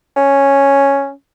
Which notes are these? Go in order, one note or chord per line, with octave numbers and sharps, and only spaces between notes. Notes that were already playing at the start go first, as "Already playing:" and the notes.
C#4